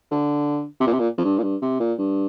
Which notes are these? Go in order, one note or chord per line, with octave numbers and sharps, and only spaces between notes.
D3
C3
A#2
C3
A#2
F2
G2
A#2
G2
C3
A#2
G2